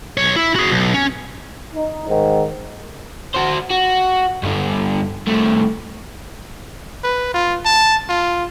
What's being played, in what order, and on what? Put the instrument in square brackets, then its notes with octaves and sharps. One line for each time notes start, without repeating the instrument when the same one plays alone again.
[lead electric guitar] B1 C#5
E4
F#4 G#4
B1
C#4
[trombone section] D#4
G#2 D#3
[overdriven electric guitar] F#4 C5
F#4
G2 D3
C2 A3
[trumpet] B4
F4
A5
F4